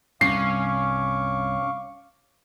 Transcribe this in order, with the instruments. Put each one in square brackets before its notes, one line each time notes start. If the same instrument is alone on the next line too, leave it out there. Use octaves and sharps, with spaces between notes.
[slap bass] C2 G2 [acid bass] C#4 [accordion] F5 C#6 D6 [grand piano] C7